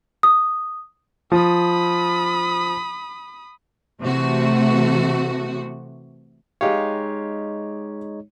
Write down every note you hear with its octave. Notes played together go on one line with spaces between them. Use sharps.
D#6
F3 B5 D#6
C3 E3 A3 F#4
G#3 D#4 G4 C#5 F5